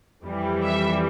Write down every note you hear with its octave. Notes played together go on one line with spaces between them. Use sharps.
F2 E3 G3
E5